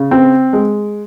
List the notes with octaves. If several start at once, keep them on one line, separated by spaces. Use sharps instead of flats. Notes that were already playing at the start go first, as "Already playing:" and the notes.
Already playing: C#3
C4
G#3